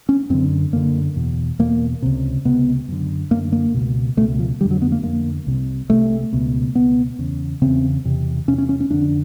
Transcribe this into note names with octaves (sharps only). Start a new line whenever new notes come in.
C#4
F#2 D3 C4
F#2 D3 A#3
E2 B2
E2 B2 A#3
C#2 C3
C#2 C3 B3
F#2 D3
F#2 D3 A#3
A#3
C#2 B2
C#2 B2 A3
F3
F2 D3 G3
F#3
B3
A#3
F2 D3 A#3
C2 C3
C2 C3 A3
C#2 B2
C#2 B2 B3
E2 C#3
E2 C#3 C4
E2 C3
E2 C3 C#4
C#4
C#4
C#4
F2 D3 D4